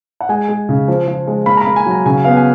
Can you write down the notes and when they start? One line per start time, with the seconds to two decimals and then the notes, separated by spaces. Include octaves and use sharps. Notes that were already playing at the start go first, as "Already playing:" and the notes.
0.21 F#5
0.29 G#3 G#5
0.49 G#3
0.69 C#3
0.88 F3
1.07 F3
1.27 G#3
1.46 A#3 B5
1.57 A#5
1.61 B5
1.66 A#3
1.76 G#5
1.86 F#3 A#5
2.06 C#3 G#5
2.24 B3 F5
2.37 G#5